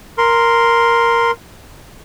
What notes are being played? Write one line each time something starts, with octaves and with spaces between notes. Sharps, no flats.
A#4 C6